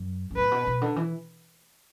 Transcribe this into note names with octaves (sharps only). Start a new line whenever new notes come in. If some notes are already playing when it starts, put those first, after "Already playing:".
Already playing: F#2
F#2
A2 B4
B2
B2
D3
E3